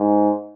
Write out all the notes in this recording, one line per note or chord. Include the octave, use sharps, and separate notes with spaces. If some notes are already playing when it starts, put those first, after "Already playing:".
Already playing: G#2